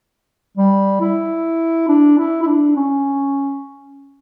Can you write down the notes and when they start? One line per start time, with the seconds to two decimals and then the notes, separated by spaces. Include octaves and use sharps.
0.57 G3
1.01 E4
1.88 D4
2.18 E4
2.42 E4
2.47 D4
2.76 C#4